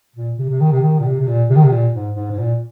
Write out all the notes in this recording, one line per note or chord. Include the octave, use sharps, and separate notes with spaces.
A#2
C3
C3
D#3
C3
D#3
A#2
C3
C3
A#2
C3
D#3
C3
A#2
G#2
G#2
G#2
A#2